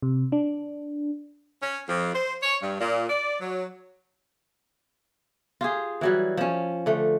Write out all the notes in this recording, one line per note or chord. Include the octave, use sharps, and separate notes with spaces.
C3
D4
C#4
F2
C5
C#5
G2
A#2
D5
F#3
F4 G4 G#4
E3 F#3 G3
F3 C#4
D3 A3